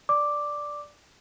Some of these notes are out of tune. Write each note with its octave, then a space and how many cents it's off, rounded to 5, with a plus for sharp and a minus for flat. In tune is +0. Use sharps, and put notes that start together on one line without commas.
D5 +0 D6 +0